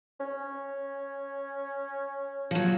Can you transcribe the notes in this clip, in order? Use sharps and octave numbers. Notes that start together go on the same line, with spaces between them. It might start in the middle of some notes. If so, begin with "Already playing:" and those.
C#4
F3 F#3